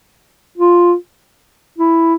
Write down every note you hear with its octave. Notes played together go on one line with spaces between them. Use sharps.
F4
E4